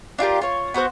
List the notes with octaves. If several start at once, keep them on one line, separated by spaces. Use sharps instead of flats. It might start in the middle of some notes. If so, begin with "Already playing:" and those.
D4 F4 G4 A#4
F4 C#5
B3 F#4 C5 F#6